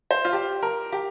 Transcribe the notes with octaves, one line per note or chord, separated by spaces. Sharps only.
C5
F4
G4
A#4
G4